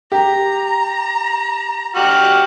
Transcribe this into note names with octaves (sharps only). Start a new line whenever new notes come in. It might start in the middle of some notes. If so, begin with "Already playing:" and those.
G4 A#5
F#4 G4 F6 F#6